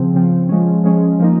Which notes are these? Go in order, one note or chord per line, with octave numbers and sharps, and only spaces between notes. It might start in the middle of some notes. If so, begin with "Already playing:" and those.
Already playing: C#3 F3 C4
C#3 F3 C4
F3 G#3 C#4
F3 G#3 C#4
F3 A#3 D#4